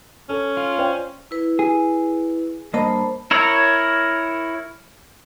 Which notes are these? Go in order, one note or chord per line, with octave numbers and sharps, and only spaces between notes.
C#4 A4
F4
C5 D5 G5
E4 B4
G#4
G2 A#3 C5 D#5 A5 B5
E4 A#4 C#5